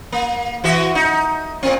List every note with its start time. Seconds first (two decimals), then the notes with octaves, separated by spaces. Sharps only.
0.12 A#3
0.64 E3 F#4 E5
0.95 D#4
1.63 A#2 C4